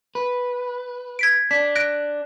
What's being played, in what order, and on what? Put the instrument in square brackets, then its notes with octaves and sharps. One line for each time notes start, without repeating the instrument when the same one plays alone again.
[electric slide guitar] B4
[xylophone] G#6 B6 D7
[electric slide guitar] D4 [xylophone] B6
[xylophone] F#6 A#6 D7